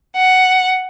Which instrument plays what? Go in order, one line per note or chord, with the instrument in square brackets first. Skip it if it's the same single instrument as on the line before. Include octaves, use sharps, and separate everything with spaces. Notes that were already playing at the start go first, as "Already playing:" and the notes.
[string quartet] F#5